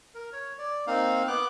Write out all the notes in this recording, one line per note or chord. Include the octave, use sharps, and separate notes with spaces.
A#4
C#5
D5
A#3 C4 D#4 F5
B3 D6 F#6